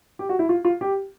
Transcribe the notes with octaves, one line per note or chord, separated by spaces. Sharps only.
G4
F#4
E4
F4
F4
G4